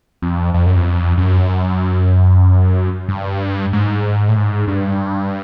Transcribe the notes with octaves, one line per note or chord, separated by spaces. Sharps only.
F2
F2
F#2
F2
F#2
G2
G#2
A2
G#2
G2